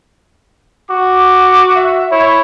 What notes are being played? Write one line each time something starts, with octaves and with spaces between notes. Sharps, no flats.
F#4 D6
E5
E4 C#5